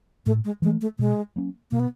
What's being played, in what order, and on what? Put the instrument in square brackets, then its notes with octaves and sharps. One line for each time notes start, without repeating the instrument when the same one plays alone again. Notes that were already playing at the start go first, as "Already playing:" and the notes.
[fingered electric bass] A2 [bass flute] A3
[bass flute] G#3
[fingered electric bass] E3 [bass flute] G#3
[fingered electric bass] A3
[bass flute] A3
[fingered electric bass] B2 [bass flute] G#3
[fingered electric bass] F#3 A#3 C#4
[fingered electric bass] B2 [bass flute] A#3
[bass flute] B3